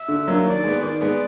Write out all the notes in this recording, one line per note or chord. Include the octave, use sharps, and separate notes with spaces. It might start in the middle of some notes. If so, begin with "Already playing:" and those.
Already playing: E5
D3
F#3 A#3 D4
D#3 D5
G#3 B3
D#3 D5
G#3 B3